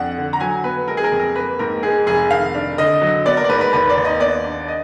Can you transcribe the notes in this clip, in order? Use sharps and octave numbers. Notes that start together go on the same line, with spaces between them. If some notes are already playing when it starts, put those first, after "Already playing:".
Already playing: F2 D4 F#5
D3
A#5
F#3 G#5
B3 B4
G#3 A#4
G#4
A#4
F2
A#4
A#3 B4
G#2 A#4
G#3 G#4
F1 G#4
D#3 F5
D4
D3 D#5
F#3
B3 D5
A#4
D5
G#2 B4
B4
D#2 B4
D5
D#2
D#5
B3 D5
D4
D#5